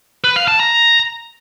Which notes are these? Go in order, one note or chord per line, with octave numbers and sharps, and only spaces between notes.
B4
F5
A5
A#5